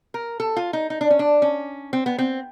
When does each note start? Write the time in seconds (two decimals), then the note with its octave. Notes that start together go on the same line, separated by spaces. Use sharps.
0.14 A#4
0.40 A4
0.56 F4
0.73 D#4
0.90 D#4
1.01 D4
1.10 C#4
1.19 D4
1.42 C#4
1.93 C4
2.06 B3
2.18 C4